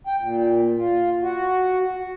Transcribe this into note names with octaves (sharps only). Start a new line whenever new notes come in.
G5
A#2
F4
F#4